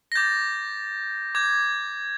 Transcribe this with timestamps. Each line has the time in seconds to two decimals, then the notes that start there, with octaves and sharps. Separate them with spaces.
0.12 A#6
0.15 D6 G6 A6
1.35 D6 G6 G#6